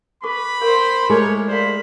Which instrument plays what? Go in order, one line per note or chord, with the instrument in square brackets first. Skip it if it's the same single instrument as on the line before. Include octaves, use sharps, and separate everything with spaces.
[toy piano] A4 C#6 D6 [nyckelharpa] B4 [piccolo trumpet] B5
[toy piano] A#4 F5 C#6 [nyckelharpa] C5 G5
[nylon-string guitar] G#3 A3 G#4 [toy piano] E4 G4 D6 [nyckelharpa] A#4 [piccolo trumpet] C#5
[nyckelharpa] A#4 B5 [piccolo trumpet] C5 [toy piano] D5 F5